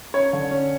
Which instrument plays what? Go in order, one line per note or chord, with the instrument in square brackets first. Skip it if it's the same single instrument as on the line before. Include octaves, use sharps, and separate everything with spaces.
[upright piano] C#4 C#5
D3
C#4